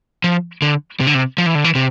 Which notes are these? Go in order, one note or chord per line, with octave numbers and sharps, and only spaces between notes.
F3
D3
C3
D3
C3
F3
E3
D3
E3
C3